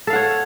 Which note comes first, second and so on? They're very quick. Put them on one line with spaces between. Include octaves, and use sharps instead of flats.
A4 F5 F#5 C#5